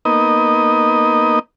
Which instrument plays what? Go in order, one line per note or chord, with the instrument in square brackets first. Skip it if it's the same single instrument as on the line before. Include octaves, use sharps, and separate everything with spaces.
[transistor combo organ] A#3 B3 D#4 D#5